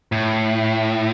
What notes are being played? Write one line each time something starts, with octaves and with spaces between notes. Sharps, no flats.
A2